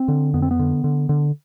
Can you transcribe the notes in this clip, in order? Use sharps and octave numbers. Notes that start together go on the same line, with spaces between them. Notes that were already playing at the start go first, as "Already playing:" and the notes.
Already playing: C4
D3
F2 B3
C4
B3
D3
D3
D3